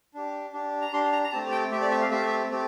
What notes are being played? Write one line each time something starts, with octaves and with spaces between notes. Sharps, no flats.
D4 G4
D4 G4
A#5
D4 G4 C6
A#5
A#5
A3 C4 G4 A5
G5
A3 C4 G4 E5
D5
E5
F5
A3 C4 G4 E5
A3 C4 G4